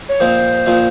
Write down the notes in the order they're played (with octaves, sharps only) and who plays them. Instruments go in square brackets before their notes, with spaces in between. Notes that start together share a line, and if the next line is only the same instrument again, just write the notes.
[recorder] C#5
[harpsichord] A#2 F3 C4 D#4 [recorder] C5
[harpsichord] A#2 F3 C4 D#4